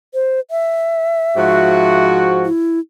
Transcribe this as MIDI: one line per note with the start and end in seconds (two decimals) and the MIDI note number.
0.14 0.40 72
0.51 2.06 76
1.36 2.46 44
1.36 2.46 53
1.36 2.46 66
2.45 2.79 64